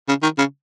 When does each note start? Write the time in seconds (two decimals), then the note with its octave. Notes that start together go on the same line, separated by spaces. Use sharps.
0.08 C#3
0.23 D#3
0.38 C#3